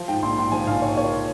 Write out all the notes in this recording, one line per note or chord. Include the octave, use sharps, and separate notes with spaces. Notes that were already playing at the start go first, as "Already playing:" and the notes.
Already playing: F3
G#2 G5
A#1 C6
G#2 C6
F3 G#5
A#1 F5
G#2 C#5
A#3 C#5